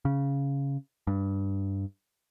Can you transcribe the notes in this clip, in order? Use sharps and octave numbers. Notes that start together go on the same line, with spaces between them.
C#3
G2